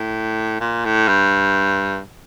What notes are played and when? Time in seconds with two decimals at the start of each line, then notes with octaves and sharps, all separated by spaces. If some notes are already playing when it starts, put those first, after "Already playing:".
Already playing: A2
0.61 A#2
0.85 A2
1.08 G2